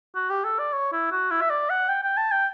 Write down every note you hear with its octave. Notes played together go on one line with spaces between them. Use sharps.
F#4
G4
A4
D5
C#5
E4
F#4
E4
E5
D5
F#5
G5
G5
A5
G5